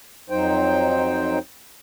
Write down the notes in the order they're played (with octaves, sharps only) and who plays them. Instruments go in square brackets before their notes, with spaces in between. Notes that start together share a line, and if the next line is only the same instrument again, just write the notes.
[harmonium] F2 F#3 D#4 C5 G5